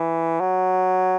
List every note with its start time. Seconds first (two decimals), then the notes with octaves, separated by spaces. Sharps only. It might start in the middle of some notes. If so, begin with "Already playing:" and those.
Already playing: E3
0.40 F#3